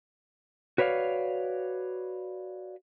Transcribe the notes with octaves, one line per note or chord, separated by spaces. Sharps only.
F#4 B4 C#5 D5 F5